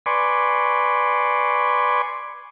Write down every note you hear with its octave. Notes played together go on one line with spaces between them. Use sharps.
B4 D5 G#5 C6 C#6